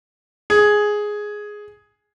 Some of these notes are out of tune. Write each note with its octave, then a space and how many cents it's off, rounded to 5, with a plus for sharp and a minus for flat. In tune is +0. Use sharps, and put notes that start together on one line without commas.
G#4 +5